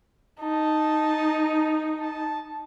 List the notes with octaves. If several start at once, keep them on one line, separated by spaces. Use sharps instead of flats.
D#4 A5
A5